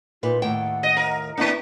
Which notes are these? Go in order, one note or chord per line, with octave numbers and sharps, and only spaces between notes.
A#2 D#4 F4 B4
D#2 A2 F#5 G5
D#5
A#4
A#3 B3 D4 E4